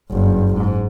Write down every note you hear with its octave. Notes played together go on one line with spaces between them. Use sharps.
F#1 G2
G#2